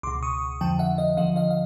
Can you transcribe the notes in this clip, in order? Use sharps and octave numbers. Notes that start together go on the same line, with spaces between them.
C#2 B2 C6 D6
C#6 D#6
F2 D3 F3 G5 A5
E5 F#5
D#5 F5
D#2 D3 F3 D#5 F5
D#5 F5
F5